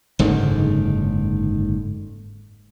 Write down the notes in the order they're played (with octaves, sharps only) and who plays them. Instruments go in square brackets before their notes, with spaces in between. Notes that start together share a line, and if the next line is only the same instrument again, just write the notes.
[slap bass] F#1 G#2 D3 D#3